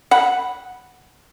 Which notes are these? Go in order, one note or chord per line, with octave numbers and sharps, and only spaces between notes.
F#5 B5